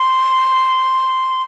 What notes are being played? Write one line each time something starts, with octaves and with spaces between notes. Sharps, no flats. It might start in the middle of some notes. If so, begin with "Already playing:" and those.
Already playing: C6